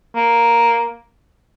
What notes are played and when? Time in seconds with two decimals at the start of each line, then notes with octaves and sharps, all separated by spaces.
0.15 A#3